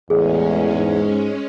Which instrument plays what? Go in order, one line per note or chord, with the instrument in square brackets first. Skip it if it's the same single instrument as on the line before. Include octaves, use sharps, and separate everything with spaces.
[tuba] A1 [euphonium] E2 [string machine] G#3 C#4 [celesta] G#4
[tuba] G#2